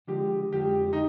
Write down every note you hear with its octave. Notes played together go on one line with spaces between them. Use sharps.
D3 F3 G#3 G4
F2 D3 F3 G#3 G4
D#4